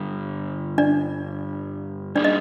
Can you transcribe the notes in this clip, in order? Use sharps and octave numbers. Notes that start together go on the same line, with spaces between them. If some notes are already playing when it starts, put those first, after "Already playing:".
Already playing: G2 D3 G3
D4 D5
G3 A#3 D4 D#4 G#4 D5
D#5